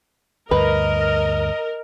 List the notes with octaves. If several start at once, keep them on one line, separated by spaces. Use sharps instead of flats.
D2 G2 A#4 B4 D#5